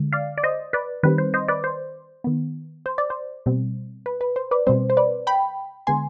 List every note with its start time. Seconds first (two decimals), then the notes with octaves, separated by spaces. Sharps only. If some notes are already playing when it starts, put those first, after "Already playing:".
Already playing: D3 G#3
0.13 D5 F5
0.38 D5
0.43 C5 D#5
0.73 B4 D5
1.03 D#3 G3 C4 B4
1.18 C5
1.34 C5 D#5
1.48 B4 D5
1.64 C5
2.24 D#3 B3
2.86 C5
2.98 D5
3.10 C5
3.46 B2 G3 C4
4.06 B4
4.21 B4
4.36 C5
4.51 B4 D5
4.67 B2 G3 C4 C5
4.90 C5
4.97 B4 D5
5.27 G5 B5
5.87 D3 G#3 B3 G#5 C6